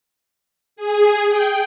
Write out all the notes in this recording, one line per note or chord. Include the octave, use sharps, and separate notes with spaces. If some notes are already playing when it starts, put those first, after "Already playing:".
G#4
G5